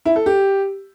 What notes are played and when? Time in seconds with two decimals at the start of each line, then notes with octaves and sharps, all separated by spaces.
0.05 E4
0.16 A4
0.26 G4